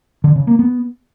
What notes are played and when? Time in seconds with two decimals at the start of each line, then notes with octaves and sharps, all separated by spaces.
0.24 D3
0.36 C#3
0.47 A#3
0.59 B3